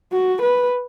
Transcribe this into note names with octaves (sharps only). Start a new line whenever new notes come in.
F#4
B4